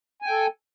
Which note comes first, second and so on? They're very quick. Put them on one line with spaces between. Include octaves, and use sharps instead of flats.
G#5 G5 A4